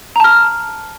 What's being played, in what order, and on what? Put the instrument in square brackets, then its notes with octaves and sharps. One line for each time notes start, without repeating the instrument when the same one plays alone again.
[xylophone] A#5
A5
F6